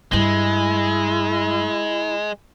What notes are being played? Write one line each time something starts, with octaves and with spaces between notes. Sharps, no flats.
G2 G3 G#3 E4